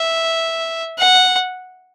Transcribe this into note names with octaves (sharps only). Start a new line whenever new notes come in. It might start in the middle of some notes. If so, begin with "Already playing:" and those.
Already playing: E5
F#5